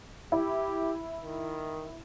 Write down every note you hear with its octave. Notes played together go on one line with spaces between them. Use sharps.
E4 G4
D#3